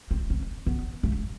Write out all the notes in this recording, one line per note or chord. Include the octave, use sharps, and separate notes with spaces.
C4
C4
B3
A3